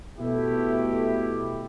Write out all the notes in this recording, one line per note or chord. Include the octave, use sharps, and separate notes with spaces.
B2 A3 E4 G4